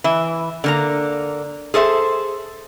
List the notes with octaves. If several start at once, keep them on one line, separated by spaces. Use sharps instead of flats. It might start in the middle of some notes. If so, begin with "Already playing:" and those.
E3 E5
D3 A#3 A#5
G#4 A4 C5 E5